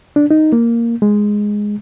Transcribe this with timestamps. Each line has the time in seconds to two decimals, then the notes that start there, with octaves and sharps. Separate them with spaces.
0.16 D4
0.31 D#4
0.53 A#3
1.02 G#3